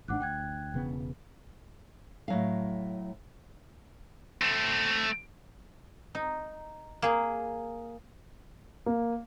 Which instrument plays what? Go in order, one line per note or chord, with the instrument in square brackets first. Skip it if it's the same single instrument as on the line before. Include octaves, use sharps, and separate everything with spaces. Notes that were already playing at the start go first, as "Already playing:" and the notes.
[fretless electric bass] G#1 G#2 D4 [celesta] F#5 D6 F#6
[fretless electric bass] D2 [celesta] G5 F#6 G#6
[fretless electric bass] E1 C#3 B3
[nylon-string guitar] A2 F#3 F5
[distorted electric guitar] A3 C4
[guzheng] D#4
A#3 G#4
[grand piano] A#3